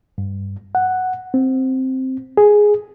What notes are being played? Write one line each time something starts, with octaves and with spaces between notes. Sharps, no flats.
G2
F#5
C4
G#4